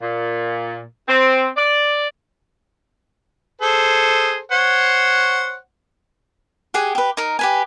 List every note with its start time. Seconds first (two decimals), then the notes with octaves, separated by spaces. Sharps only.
0.01 A#2
1.08 C4
1.57 D5
3.61 G#4 A4 C5
4.52 C5 C#5 F#5
6.74 G4 G#4 F#5 G#5
6.95 G4 B4
7.17 D#4 A#4
7.39 G4 B4 G#5